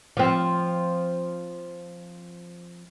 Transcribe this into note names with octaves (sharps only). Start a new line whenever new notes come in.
F3 C4